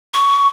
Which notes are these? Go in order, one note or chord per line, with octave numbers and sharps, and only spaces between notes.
C#6